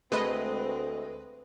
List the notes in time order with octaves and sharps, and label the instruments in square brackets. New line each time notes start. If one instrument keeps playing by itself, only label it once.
[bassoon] D2 [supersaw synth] G#3 A3 D#5 [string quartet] C4 [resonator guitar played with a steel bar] B4